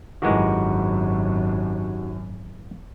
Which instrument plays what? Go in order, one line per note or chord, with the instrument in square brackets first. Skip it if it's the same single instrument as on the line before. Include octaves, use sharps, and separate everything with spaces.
[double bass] G#1 F#2 [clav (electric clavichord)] D#3 E3 G#3 [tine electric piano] D#4 F#4 G4